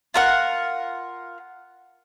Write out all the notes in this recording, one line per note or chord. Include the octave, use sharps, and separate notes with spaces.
F4 A#4 F#5